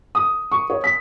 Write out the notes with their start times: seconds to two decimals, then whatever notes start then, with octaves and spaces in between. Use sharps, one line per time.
0.15 D#6
0.52 C#6
0.70 C#5
0.84 B6